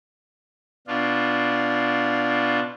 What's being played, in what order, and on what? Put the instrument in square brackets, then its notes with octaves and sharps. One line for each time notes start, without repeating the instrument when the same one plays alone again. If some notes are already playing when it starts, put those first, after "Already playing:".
[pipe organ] B2 D4 F4